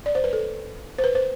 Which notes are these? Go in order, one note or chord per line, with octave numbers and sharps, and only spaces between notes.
D5
C5
B4
A4
C5
B4
C5